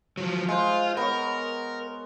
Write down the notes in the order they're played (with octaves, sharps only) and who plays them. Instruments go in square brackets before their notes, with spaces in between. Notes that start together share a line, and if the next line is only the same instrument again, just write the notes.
[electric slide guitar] F3 F#3
[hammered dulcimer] G#3 C5 [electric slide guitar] F4
[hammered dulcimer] B3 C#5 [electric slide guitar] A#4